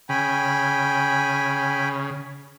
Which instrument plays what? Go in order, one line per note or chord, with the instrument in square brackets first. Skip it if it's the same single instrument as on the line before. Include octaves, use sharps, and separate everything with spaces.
[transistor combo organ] C#3 [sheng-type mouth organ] G5 G#5 B5